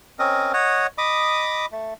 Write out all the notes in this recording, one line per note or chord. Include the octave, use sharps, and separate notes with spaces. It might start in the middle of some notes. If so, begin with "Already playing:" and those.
C4 C#4 A#4 D#5
C#5 D#5 F#5
D#5 B5 D6 D#6
A3